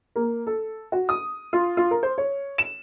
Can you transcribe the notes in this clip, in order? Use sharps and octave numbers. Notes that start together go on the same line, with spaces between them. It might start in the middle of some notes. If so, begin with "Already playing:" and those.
A#3
A4
F#4
D#6
F4
F4
A#4
C5
C#5
E7